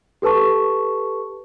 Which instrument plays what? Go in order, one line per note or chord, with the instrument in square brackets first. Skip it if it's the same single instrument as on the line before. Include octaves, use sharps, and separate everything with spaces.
[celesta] G4 A4 B4 A5 C#6